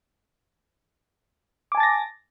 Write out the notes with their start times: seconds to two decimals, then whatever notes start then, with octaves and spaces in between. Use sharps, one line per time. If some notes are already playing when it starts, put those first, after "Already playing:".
1.72 D6
1.75 G#5
1.77 A5
1.80 A6
1.83 A#6